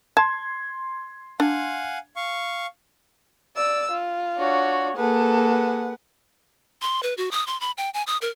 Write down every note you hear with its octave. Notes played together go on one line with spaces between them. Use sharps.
A5 C6 G#6
D4 F5 F#5 G#5
F5 C#6
D5 E6
F4
D4 F#4 C#5
A#3 G#4 A4 B4 F#5
C6
B4
F#4
D#6
C6
B5
G5
G#5
D#6
A#4